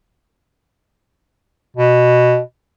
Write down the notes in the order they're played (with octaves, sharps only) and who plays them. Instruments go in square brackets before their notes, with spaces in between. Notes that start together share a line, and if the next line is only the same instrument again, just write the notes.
[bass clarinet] B2